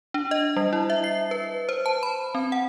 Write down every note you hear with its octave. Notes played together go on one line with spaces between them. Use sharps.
D4
D#5
G3
E4
E5
C7
B4
C5
A5
B5
C4
F#5